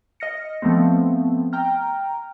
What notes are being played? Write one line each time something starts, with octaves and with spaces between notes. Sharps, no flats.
D#5 F6 A#6 C#7
F3 A3 B3 C4
G5 A#5 F6